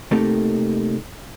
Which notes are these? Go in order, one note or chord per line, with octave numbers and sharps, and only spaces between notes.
C3 A3 A#3 D#4 G4 A4